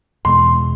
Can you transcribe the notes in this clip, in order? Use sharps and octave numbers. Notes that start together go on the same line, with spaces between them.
E2 B2 G#3 C6